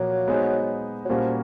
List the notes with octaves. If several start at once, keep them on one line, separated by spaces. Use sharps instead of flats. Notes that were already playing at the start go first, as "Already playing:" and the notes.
Already playing: A#2 F3 F#3 A#3
G#3 B3 D#4 G#4 C5
F#3
A#2 F3 G3 A#3 C#4 F#4